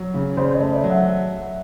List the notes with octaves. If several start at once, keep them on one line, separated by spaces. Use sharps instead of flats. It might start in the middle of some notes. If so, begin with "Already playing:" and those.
Already playing: F#3
C#3
C#3 C5 D5
C#5 D#5
A3
D5 E5
F#3
E5 F#5